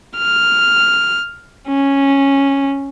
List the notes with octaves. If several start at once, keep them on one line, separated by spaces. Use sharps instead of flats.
F6
C#4